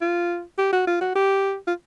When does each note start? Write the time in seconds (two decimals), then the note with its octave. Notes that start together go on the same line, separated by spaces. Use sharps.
0.01 F4
0.58 G4
0.73 F#4
0.87 F4
1.01 F#4
1.16 G4
1.67 F4